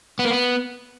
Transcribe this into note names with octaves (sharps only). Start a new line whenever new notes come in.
B3
A#3
B3